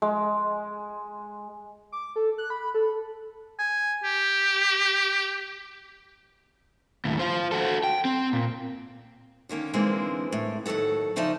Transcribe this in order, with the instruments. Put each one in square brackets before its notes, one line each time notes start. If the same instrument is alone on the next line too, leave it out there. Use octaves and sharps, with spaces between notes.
[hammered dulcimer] G#3
[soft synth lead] D6
A4
F#6
B5
A4
[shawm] G#5
G4
[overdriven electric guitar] D#2 A2
F4 C5
F#4 A4
G5
C4
A#2
[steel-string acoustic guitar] D3 D#3 A#3 C#4
D3 E3 G#3 A#3 C4 D4
A2
D#2 F3 F#3 A4 F#5
C#3 F3 D#4 D5 E5 A5